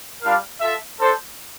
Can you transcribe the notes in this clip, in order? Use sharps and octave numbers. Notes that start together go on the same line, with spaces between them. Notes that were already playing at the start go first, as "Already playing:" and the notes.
G3 D4 F4 A#4 F5
F4 A4 E5
D4 A4 C5